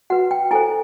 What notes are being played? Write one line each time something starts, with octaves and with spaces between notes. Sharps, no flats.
F#4 B4 F#5
G5
E4 A4 C5 G#5